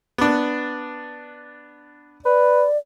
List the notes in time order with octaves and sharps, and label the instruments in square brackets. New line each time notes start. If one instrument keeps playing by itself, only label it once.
[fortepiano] B3 D4
[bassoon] B4 [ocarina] D5